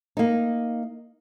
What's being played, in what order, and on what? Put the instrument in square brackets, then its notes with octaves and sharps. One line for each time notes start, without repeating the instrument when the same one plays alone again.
[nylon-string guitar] A#3 D#4